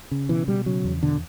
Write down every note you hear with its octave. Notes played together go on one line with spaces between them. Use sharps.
C#3
B2 E3
B2 G3
C#3 F#3
E2
B2 D3